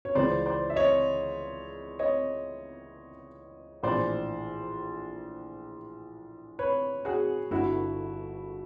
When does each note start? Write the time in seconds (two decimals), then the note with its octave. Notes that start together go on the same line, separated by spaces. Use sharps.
0.05 C#5
0.15 C#2 C#3 E3 C5 D5
0.46 C5 D5
0.70 E5
0.76 C#5 D#5
1.99 C#5 D#5
3.83 A#1 A2 E3 C5 D5
6.59 B4 C#5
7.05 F#4 G#4
7.51 G1 G2 D3 E4 F#4